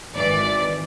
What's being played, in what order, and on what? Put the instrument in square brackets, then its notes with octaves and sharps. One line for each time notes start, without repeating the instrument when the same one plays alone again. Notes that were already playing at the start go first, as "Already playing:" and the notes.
[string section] G#1 E3 D5